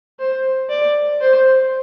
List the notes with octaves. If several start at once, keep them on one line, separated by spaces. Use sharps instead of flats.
C5
D5
C5